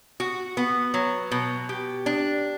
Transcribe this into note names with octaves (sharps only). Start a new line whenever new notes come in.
F#4
B3
F#3
B2
G4
D4